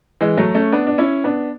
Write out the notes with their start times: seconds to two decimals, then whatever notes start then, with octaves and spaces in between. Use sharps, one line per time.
0.21 E3 G#3
0.37 F#3 A3
0.55 A3 C#4
0.72 B3 D4
0.87 D4
0.98 C#4 E4
1.24 B3 D4